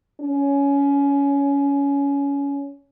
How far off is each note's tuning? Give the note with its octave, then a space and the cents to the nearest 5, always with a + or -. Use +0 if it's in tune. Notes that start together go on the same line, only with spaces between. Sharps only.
C#4 +20